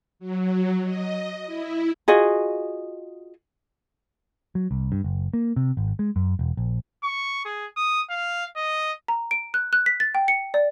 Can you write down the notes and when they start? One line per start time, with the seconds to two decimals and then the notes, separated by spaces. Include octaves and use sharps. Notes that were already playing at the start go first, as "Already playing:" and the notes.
0.19 F#3
0.84 D#5
1.46 E4
2.08 F4 F#4 G#4 D#5
4.55 F#3
4.71 C2
4.92 G2
5.04 F#1
5.33 A#3
5.56 C3
5.77 G#1
5.99 G#3
6.16 F#2
6.39 E1
6.57 A#1
7.03 C#6
7.45 G#4
7.77 D#6
8.10 F5
8.56 D#5
9.08 A#5
9.31 D7
9.54 F#6
9.73 F#6
9.86 B6
10.00 A6
10.15 G5
10.28 C#7
10.54 D5